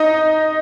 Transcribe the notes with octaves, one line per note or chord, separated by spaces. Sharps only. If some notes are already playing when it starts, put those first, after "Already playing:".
Already playing: D#4 D#5